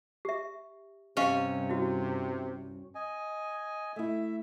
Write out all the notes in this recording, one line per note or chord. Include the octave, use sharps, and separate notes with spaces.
G4 E5
C2 G2 C3 C#4 G4 D#5 F5
E4 F#4
D#5 G#5
A3 E4 E5